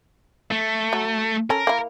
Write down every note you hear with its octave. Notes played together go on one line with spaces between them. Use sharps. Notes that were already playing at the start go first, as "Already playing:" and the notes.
A3
F#3
C#4 A4 A#4
A#3 E4